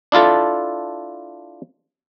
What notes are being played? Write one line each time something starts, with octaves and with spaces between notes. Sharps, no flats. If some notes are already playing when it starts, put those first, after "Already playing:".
D4 E4 F4 A4